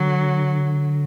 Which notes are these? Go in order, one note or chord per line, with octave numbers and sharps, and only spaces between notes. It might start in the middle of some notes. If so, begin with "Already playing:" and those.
Already playing: D3 F#3